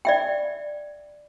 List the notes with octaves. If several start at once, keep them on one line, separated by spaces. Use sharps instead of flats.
D5 E5 G5